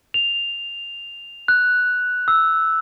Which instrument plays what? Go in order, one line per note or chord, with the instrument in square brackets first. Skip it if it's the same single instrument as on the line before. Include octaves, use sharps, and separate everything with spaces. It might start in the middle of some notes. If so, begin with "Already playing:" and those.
[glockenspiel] F7
F#6
E6